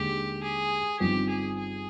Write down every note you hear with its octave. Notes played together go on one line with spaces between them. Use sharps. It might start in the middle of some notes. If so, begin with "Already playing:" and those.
Already playing: D#2 D3 G#3 G4
G#4
G1 G2 F3 C4 D#4 G4
G#4
G#4